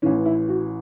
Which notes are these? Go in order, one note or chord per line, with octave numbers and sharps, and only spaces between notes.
A1 A2 E3 C#4
E4
F#4